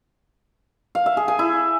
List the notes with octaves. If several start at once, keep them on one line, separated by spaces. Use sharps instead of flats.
F5
E5
G#4
G#5
E4